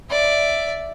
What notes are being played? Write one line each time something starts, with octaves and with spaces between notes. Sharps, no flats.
D5 E5